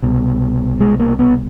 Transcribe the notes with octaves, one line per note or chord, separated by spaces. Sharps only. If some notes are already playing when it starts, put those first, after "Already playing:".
C2 B2
G#3
A#3
B3